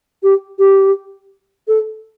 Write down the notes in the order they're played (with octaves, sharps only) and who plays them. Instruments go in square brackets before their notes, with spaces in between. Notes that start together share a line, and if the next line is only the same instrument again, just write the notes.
[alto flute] G4
G4
A4